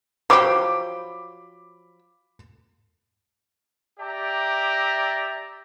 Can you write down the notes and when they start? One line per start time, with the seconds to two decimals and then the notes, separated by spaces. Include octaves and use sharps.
0.30 F3 F#3 G4 B5 D6
3.99 G4 D5 E5 A#5